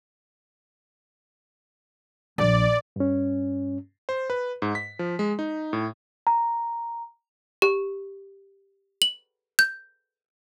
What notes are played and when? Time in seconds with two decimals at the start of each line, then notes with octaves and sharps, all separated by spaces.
2.38 A#1 D5
2.96 G2 C#4
4.09 C5
4.30 B4
4.62 G#2
4.75 B6
4.99 F3
5.19 G#3
5.39 D#4
5.73 A2
6.27 A#5
7.62 G4
9.02 F#7
9.59 G6